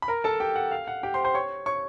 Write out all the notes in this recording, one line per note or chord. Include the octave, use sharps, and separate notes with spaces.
B5
A#4 A#5
A4 A5
G4 G5
F#5
F5
F#5
G4 G5
C5 C6
C5 C6
C#5 C#6
C#5 C#6